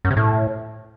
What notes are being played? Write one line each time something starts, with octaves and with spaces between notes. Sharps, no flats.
F#2
C3
A2